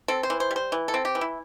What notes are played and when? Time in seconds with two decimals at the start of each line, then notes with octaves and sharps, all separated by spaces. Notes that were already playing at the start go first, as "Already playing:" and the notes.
0.08 C4 A4
0.23 C5
0.30 E3
0.40 C5
0.51 G3
0.56 C5
0.72 E3
0.88 A4
0.94 C4
1.05 G4
1.15 E3
1.21 E4